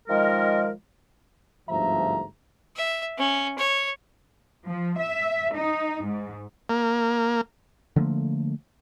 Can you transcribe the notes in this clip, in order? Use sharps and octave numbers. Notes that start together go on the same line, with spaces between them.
D#3 F3 G#3 A#4
G1 D2 G#2 F3 E5 A#5
E5
C#4
C#5
F3
E5
D#4
G#2
A#3
D3 F3 A3 A#3